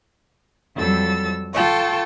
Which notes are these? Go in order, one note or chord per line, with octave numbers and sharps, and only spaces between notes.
F2 F#3 G3 A4 E6 A6
F4 A4 F5 G5 A5 C#6